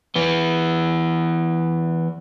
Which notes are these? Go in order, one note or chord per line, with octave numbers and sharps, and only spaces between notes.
E3 B3